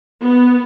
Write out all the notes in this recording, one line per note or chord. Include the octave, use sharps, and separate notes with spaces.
B3